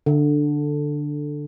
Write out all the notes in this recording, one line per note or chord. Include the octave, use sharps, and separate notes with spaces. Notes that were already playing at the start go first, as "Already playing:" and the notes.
D3